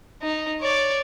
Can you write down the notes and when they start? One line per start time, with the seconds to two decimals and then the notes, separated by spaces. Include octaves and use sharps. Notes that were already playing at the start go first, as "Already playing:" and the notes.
0.22 D#4
0.61 C#5 D5